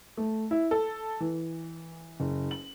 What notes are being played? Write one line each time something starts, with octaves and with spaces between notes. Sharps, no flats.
A3
E4
A4
E3
F#1
F#7